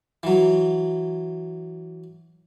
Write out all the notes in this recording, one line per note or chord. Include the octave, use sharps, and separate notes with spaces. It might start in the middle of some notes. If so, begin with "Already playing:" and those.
E3 F#3